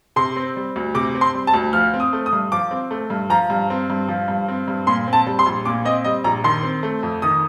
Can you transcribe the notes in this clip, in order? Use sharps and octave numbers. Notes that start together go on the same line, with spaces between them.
C3 C6
C4
G3
D2
C3 D6
C4
C6
G3
A5
D2
F3 F6
C4
D#6
A3
D#6
G2
F3 D6
C4
A3
G2
F3 A#5
G2
C4
G2
F3
G2
C4
G2
A#2 C6
C4
A5
G3
C6
A#1
A#2 D6
C4 D#5
G3 D#5
A#1 A#5
D#3 C6
C4
A3
F2
D#3 D#6